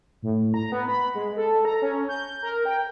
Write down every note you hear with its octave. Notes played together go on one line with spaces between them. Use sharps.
A2
A#5
B3
B5
G#3
A4
A#5
C#4
G6
A#4
G5